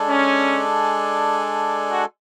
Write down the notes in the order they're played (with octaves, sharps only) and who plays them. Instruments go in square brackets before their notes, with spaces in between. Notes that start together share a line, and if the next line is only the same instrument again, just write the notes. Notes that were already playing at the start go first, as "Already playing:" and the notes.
Already playing: [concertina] G#3 D4 A4 D5 G#5
[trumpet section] C#4
F#4